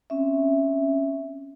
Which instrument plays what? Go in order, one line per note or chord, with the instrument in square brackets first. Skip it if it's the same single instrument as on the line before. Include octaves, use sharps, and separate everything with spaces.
[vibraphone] C4 C#4 E5